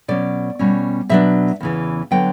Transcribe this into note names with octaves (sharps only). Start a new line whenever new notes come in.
B2 F#3 C#4 D5
B2 G3 C#4
B2 F#3 B3 D4 E5
E2 C#3 E3
D3 F#3 B3 G5